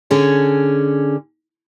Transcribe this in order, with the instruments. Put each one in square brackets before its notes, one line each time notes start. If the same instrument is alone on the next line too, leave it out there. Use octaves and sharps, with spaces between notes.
[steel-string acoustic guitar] D3 C#4 G#4